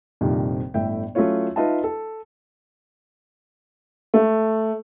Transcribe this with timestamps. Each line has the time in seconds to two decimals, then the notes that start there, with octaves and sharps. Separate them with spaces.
0.21 A#1 F2 C3 D#3 G3
0.74 G1 A2 E5 G5
1.15 F#3 A3 C#4 E4 F4 C#5
1.56 D#4 F4 B4 D#5 E5 A5
1.84 A4
4.14 A3